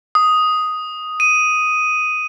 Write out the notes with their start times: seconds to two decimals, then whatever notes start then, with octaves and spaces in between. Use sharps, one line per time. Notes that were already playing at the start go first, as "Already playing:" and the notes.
0.15 D#6
1.20 D#7